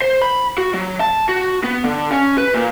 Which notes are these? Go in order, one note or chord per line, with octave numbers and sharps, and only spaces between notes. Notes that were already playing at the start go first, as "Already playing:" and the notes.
C5
B5
F#4
F#3
A5
F#4
B3
D3
C#4
B4
A#2